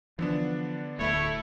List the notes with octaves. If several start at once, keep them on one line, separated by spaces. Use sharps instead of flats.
D3 E3 F3 B3 D4
D1 D2 A3 E4 C#5